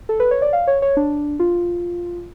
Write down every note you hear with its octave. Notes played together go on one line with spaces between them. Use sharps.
A4
B4
C#5
D5
F5
C#5
C#5
D4
F4